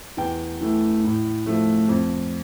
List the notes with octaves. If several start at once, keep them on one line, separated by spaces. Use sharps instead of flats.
E2 G5
E3 A3
A2
F3 A3
F2